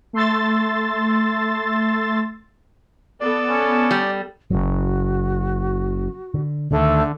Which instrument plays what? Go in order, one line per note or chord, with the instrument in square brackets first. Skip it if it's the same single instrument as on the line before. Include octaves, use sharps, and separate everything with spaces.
[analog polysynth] A3 C6 E6 A6
[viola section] B3 A4 [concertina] D5
[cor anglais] C#4
[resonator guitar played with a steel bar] G3
[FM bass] F#1 [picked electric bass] C#3 F#3 [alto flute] F#4
[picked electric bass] D3
[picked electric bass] D2 D#3 [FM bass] D3 [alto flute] A3